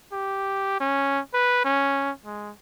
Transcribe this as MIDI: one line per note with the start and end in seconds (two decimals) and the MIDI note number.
0.13 0.78 67
0.80 1.20 61
1.34 1.62 71
1.64 2.11 61
2.25 2.52 56